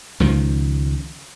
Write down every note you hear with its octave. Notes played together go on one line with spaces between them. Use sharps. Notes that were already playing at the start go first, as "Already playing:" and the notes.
C#2 D#3 F3